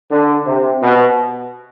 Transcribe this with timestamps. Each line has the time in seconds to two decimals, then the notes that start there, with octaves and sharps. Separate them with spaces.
0.11 D3
0.46 C3
0.81 B2